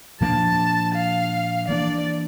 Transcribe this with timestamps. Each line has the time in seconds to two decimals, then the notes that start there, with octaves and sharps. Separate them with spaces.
0.20 A#2 F3 A#3 D4 A5
0.94 F5
1.68 E3 A#3 D4 D5